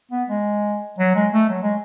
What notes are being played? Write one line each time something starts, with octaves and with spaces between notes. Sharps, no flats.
B3
G#3
F#3
G#3
A3
F#3
G#3